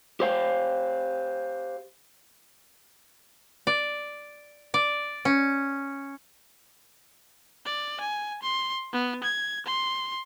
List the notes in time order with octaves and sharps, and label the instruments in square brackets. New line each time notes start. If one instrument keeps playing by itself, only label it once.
[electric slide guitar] G4 C5 F5
[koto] D5
D5
C#4
[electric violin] D5
G#5
C6
B3
G#6
C6